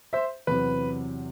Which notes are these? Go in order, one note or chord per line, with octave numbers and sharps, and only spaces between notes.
C5 E5
E2 C3 F#3 B4